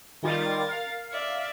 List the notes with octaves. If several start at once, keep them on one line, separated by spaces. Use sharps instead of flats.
D#3 G3 F4 A#4 A6
F5
D5 E5